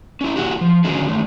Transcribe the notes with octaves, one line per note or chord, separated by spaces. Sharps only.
C#4 E4
A#2 D#3 E4 F#4 G4
F3
D3 D#3 C#4 F#4 G#4
D#3 E3 A3